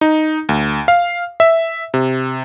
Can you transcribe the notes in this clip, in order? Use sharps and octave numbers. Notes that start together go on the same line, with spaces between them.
D#4
D2
F5
E5
C3